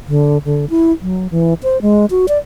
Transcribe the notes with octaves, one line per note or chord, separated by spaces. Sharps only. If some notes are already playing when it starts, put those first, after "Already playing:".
D3
D3
E4
F#3
E3
C5
G#3
F#4
D5